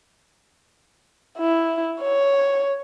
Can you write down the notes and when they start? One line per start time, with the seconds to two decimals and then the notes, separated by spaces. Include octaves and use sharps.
1.39 E4
2.02 C#5